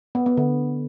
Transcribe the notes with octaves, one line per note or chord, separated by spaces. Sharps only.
B3
B3
D3